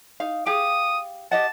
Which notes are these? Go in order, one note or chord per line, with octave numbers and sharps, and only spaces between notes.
D#4 F5
G4 G#4 F5 D#6
G4 D#5 F#5 A5